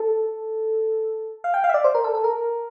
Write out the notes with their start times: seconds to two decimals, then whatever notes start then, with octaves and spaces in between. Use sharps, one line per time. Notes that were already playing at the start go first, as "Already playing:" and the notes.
Already playing: A4
1.44 F5
1.54 G5
1.64 F5
1.69 E5
1.74 D5
1.84 C5
1.95 A#4
2.04 A4
2.15 A4
2.24 A#4